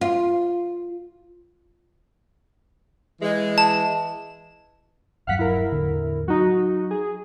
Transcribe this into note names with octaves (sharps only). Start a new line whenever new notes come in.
F4
E3 G#3
A5
D#1 G2 F#3 F5 F#5 B6
E4 A#4
E2 A2 D3
F#3 D#4 F#4
G#4